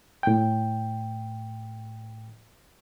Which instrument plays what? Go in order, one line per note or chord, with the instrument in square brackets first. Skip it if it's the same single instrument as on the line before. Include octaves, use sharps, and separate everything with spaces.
[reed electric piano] A2 G5